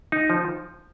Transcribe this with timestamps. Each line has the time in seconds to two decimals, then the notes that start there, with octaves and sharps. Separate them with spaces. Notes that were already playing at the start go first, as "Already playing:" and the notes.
0.12 D#4
0.30 F3